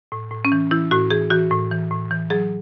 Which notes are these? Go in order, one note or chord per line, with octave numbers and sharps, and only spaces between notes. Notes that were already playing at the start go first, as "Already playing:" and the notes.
A2
A2
C#4
E3
E3 E4
A2 F#4
E3 G#4
E3 F#4
A2
E3
A2
E3
F#3 G#4